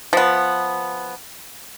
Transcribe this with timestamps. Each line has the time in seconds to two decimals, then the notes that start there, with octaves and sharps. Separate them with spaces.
0.13 F3 B3